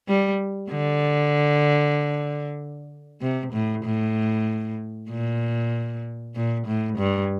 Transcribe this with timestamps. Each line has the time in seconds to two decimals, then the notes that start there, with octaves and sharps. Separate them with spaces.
0.08 G3
0.71 D3
3.22 C3
3.53 A2
3.85 A2
5.10 A#2
6.36 A#2
6.67 A2
6.98 G2